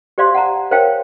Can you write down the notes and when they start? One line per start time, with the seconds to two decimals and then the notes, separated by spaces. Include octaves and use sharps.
0.18 G4 C5 D5 F5 C6
0.34 F#5 A5 A#5
0.71 A#4 C5 C#5 F5 G5 A5